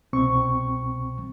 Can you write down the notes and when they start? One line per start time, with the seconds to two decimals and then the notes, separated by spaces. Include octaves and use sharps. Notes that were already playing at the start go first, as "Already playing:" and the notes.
0.13 C2 B2 C4 C#6